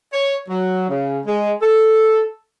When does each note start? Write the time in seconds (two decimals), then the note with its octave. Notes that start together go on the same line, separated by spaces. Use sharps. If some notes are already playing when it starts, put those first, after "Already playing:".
0.12 C#5
0.49 F#3
0.89 C#3
1.26 G#3
1.61 A4